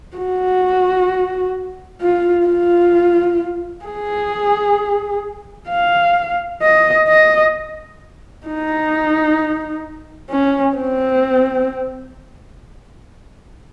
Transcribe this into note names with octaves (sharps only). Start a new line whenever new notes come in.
F#4
F4
F4
G#4
F5
D#5
D#5
D#4
C#4
C4